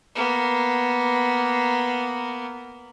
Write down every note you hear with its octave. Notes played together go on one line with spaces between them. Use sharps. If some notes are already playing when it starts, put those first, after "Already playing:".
A#3 B3